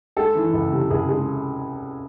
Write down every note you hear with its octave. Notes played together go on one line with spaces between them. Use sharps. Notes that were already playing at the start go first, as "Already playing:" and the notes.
G#3 A4
E3
C#2
C3
C#2 G#4
G#3